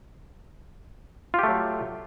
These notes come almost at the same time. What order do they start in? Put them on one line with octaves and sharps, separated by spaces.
F4 G4 A3 F#3